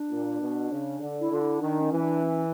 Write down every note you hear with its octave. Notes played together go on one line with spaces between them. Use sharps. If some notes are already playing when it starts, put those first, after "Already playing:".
Already playing: D4
A#2
B2
C#3
D3
E4
D3 F4
E4
D#3 D4
C#4
E3
D4
C#4